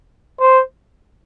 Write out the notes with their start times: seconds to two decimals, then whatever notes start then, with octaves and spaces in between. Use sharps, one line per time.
0.41 C5